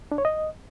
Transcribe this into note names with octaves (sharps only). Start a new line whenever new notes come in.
D4
C#5
D#5